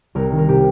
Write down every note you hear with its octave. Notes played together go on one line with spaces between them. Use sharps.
C2 A#4
D#3
A#4
C3 G4